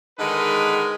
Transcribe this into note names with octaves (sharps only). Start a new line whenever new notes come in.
D3 D#3 G#3 D#4 A#4 B4